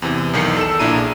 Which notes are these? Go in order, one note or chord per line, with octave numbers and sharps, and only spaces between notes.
E2 C3 E3
B1 E2 D#3 G6 C7 C#7
A4 E6 E7
A#1 A#2 D4 E4 A#5 D#7
G#4